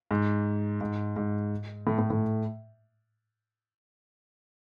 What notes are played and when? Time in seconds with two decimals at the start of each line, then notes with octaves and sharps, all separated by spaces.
0.11 G#2
0.81 G#2
1.16 G#2
1.87 A2
1.99 A2
2.10 A2